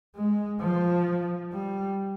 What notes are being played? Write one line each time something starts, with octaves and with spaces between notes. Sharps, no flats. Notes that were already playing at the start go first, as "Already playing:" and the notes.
G#3
F3
G3